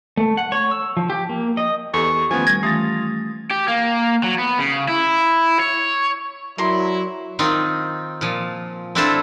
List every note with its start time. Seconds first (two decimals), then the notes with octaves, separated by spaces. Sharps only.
0.17 A3
0.37 F#5
0.52 C#5
0.71 E6
0.97 F3
1.10 G4
1.29 A#3
1.57 D#5
1.94 E2 G4 A4 C#6
2.31 D#3 F3 A3 B3 C#4 G#5
2.47 G3 G#6 A#6
2.63 E3 A3 F4 G4 D#6 A6
3.51 G4
3.68 A#3
4.24 F#3
4.38 B3
4.59 C#3
4.88 E4
5.60 C#5
6.58 F#3 E4 A#4 D5 C6
7.39 D#3 C4 D#4 F4
8.21 A#2 F3
8.95 C4 D4 E4 F4 A4 C5